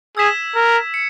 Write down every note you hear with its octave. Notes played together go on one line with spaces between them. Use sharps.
G#4 E6 G#6 B6 E7
A#4
C#7